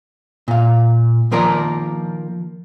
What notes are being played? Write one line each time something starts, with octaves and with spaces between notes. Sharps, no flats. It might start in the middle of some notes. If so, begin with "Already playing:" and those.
A#2 F5
D#3 F3 A#3 A#4 D5 A#5